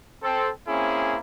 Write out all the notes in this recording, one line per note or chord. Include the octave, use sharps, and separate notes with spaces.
C4 A4
A#3 C4 C#4 E4 G#4